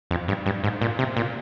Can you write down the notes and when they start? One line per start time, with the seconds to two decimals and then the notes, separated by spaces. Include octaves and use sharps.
0.11 F2
0.28 G2
0.46 G2
0.64 G#2
0.82 A#2
0.99 C3
1.17 A#2